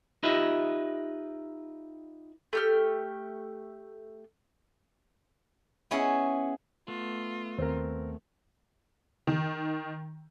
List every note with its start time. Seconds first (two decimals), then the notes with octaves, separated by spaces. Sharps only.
0.23 D#4 F4 G4 B4 D#5 E5
2.53 A3 G4 F6
5.91 B3 C#4 E4 G#4
6.88 A3 B3 F4
7.58 D#2 C4 A#4
9.27 D#3